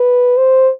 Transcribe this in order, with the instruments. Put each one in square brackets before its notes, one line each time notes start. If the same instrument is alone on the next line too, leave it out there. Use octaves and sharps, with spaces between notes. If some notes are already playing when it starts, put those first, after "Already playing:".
Already playing: [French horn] B4
C5